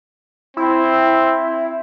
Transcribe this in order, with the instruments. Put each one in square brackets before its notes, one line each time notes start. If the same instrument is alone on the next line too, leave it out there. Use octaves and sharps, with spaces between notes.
[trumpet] C4 [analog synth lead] E4